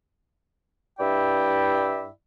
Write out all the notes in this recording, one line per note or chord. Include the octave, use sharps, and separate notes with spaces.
G2 E4 D5 E5 G5